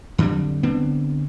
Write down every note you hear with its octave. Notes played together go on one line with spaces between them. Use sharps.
F2 D3 F#3 G3
D3 B3 C4